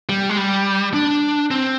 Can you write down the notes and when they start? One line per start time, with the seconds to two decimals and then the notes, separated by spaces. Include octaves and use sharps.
0.09 G3
0.29 G#3
0.37 G3
0.94 D4
1.51 C4